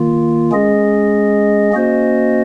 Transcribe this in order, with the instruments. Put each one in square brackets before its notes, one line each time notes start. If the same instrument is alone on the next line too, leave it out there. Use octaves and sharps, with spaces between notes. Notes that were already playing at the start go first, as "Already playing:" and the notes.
Already playing: [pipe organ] D#3 A#3 F4
G#3 C#4 G#4 D#5
A#3 C#4 F#4 C5 D#5